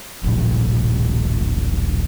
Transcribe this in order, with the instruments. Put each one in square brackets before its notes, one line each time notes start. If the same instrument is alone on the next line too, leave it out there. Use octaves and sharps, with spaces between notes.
[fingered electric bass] D#1 A#1 A2